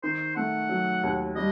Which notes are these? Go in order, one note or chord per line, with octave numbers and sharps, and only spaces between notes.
D#3 C5
A3 F#5
F#3
D#2
G3 D#5